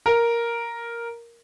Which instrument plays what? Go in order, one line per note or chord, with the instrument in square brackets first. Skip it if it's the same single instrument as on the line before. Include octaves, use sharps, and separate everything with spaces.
[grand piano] A#4